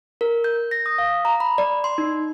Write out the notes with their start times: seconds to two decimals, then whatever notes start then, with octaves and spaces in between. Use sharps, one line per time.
0.21 A#4
0.44 G6
0.71 A#6
0.86 D#6
0.98 F5
1.25 A#5
1.40 B5
1.58 D5
1.84 C6
1.98 D#4